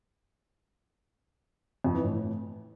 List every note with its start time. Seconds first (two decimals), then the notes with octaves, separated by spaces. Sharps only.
1.84 F2
1.94 E3
2.04 A2